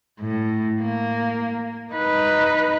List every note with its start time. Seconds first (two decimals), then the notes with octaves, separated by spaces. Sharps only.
0.20 A2
0.82 A#3
1.94 D#4 B4